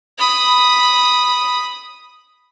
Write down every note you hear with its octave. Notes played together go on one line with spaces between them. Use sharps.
B5 D#6